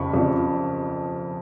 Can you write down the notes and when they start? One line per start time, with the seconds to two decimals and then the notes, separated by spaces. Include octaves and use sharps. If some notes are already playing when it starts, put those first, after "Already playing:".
Already playing: F2 C#3 F3 B5 C#6
0.13 F2 C#3 F3